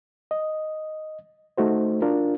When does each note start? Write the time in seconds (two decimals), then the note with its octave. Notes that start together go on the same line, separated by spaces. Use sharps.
0.31 D#5
1.58 A3 D#4 F#4 C5
2.02 D4 F4 A#4